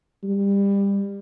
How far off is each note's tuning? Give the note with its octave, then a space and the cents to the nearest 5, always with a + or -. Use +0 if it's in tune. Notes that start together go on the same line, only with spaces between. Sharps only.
G3 +25